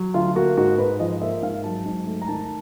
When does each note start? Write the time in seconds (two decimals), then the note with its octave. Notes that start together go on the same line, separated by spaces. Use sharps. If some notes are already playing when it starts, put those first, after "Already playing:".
Already playing: F#3
0.14 D2 F4
0.35 A#3 F#4
0.57 G#2 F#4
0.78 G#2 B4
0.99 F3 D#5
1.22 A#3 E5
1.42 G#2 F5
1.64 F#3 A5
1.85 G#2
2.07 A3
2.22 A#5
2.28 D#3 A5